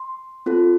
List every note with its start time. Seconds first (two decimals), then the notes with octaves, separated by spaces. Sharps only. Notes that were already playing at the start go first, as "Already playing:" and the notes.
Already playing: C6
0.46 C4 F4 A4